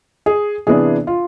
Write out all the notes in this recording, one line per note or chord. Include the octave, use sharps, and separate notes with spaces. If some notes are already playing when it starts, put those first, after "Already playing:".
G#4
C3 E3 B3 D4 G#4
F4